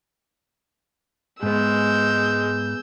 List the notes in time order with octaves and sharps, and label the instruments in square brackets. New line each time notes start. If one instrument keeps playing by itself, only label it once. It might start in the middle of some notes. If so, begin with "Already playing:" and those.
[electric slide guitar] G#2 B3 [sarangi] G#3 [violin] E6 G6